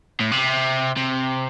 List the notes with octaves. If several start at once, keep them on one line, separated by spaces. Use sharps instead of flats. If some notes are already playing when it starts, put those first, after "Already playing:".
A2
C3
C3